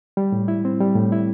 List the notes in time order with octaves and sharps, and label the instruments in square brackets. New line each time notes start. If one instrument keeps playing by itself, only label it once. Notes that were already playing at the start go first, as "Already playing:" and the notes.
[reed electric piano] G3
A2
E4
C4
G3
A2
E4